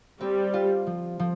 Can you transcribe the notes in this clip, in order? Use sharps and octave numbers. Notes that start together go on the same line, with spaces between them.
G3 C4
F4
F3
F3